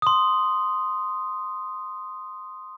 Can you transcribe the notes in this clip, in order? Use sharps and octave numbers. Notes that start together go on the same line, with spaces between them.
C6 D#6